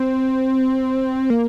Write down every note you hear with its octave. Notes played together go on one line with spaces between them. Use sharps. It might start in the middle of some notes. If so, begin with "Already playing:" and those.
Already playing: C4
A#3